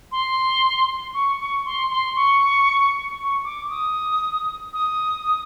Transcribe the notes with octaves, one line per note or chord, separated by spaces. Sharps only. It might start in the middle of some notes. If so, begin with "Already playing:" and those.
C6
C#6
C#6
C6
C6
C#6
C#6
D6
D#6
D#6